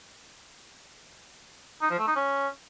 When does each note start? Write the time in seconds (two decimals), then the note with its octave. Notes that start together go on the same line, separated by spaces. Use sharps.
1.82 D#4
1.90 F3
1.99 A3
2.07 D#4
2.16 C#4